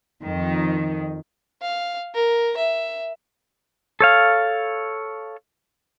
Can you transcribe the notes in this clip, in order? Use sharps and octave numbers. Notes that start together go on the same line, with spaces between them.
F2 D#3
F5
A#4
E5
A4 C#5 F5